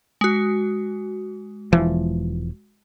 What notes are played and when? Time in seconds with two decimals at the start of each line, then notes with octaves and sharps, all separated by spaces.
0.21 G#3 F#4
1.73 E1 E3 F3